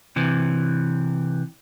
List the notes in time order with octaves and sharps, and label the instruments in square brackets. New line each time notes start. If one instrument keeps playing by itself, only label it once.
[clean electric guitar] C3 E3